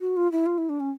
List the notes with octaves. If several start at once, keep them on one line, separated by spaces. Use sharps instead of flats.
F#4
F4
E4
F4
E4
D4
C#4